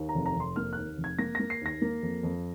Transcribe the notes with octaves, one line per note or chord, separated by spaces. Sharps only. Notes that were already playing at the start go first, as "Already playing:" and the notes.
Already playing: D#2
A#5
F1
A#5
F1 C6
A#3 F6
D#2 F#6
F1
G#6
A#3 A#6
A#3 A#6
C7
D#2 A#6
A#3
F2
F2